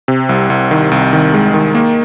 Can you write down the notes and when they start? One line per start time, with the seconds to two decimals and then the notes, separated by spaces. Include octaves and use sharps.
0.08 C3
0.29 C2
0.50 C2
0.71 D#3
0.91 C2
1.13 D#3
1.34 G#3
1.54 D#3
1.75 A#3